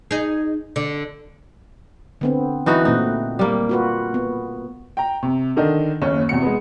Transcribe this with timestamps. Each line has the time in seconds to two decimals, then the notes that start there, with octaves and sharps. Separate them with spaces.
0.11 D#4 G#4
0.76 D3
2.21 D3 B3 C4
2.66 E3 D#4 F#4 B4
2.85 A#2 A3 C4 D#4
3.39 G3 A#3
3.69 F4 F#4 B4
4.14 B3
4.97 G5 A#5
5.23 C3
5.56 D3 D#3 D4 D#4
6.02 F#1 D#2 C#4
6.29 E2 C3 F#4 C#7
6.42 G#3 B3